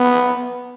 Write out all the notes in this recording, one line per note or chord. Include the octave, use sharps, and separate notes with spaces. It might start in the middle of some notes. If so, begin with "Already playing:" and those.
Already playing: B3